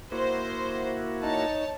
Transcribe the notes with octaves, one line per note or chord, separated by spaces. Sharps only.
A#3 E4 F#4 C5
D#4 C#5 A5